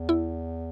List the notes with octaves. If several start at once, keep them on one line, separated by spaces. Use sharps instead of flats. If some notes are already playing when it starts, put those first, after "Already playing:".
Already playing: E2
E4